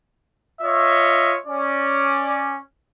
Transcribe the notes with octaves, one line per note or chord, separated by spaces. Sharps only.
F4 C#5 D#5 E5
C#4 D5